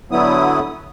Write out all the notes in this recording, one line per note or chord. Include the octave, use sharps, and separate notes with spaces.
D3 F#3 B3 E4 D#6